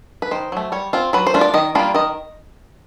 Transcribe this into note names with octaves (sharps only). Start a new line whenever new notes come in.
B4
D#3 C5
F#3 A3
G3 C#5
C4 F4
F#3 B4
C5
A3 D4 F4
D5
D#3 D#5
G3 A#3 D4 F4
D#3 D#5